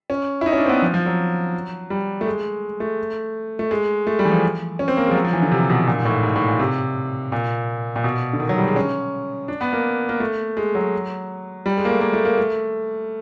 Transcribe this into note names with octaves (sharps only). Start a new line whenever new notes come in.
C#4
E4
D#4
C#4
D4
C4
B3
F3
F3
F#3
G3
A3
G#3
A3
A3
G#3
A3
G3
E3
F3
C#4
C4
A#3
G#3
F3
F#3
F3
E3
D3
C3
B2
A#2
G#2
A2
G#2
A2
A#2
C3
A#2
A#2
B2
D3
D#3
F#3
G3
G#3
C#4
D4
B3
A#3
A#3
A3
G#3
F#3
G3
G#3
A#3
A3
A#3
A3
A#3
A3